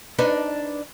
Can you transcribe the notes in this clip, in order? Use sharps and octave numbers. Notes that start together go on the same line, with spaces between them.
D4 D#4 B4